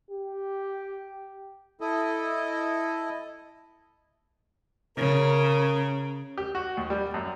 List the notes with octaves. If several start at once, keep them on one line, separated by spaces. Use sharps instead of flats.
G4
E4 A4 D#5
C#3 A#4
G4
F#4
D#2
G3
F#2